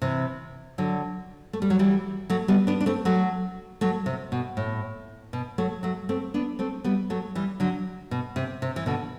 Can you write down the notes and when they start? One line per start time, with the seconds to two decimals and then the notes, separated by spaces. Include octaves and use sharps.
0.02 C3 E3
0.78 D3 F#3
1.53 A3
1.62 G3
1.70 F#3
1.79 E3 G3
2.30 F#3 A3
2.48 G3 B3
2.67 B3 D4
2.81 D4
2.86 A3 C4
3.05 F#3 A3
3.81 F#3 A3
4.06 C3
4.32 B2
4.57 A2
5.33 B2
5.58 F#3 A3
5.83 F#3 A3
6.09 A3 C4
6.34 B3 D4
6.59 A3 C4
6.84 G3 B3
7.10 F#3 A3
7.35 E3 G3
7.60 D3 F#3
8.11 B2
8.36 C3
8.62 C3
8.76 E3
8.86 B2 D3